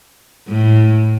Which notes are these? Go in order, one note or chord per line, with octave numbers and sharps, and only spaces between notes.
A2